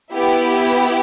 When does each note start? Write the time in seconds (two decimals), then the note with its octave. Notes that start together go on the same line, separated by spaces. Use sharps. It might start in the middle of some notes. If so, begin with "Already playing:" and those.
0.12 B3 E4 G4